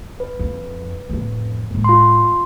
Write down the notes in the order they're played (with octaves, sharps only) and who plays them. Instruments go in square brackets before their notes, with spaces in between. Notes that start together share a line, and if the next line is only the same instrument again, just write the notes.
[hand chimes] B4
[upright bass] F2
F2 A2
A2 G#3
[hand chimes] F4 C6